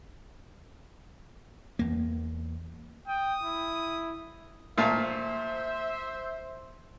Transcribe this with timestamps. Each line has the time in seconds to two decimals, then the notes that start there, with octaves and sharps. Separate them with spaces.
1.79 E2 A#3
3.07 G5 D#6
3.43 E4
4.78 A#2 A3 C5 E5 F5